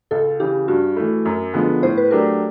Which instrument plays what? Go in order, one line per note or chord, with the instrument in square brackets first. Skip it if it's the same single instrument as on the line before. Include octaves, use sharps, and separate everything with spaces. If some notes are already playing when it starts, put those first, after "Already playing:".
[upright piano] C#2 [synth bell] A4
[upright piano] C#3 E3 [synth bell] G4
[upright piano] G2 [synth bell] F#4
[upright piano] E3 A3
F#2
D3 F3 G#3 B3
[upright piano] A2 [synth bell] C5
[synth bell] B4
[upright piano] F#3 A3 D4 G4 [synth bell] A#4